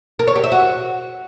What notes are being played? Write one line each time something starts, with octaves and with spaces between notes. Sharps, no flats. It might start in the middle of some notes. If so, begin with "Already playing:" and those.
A#4
C#5
G4
E5
F#4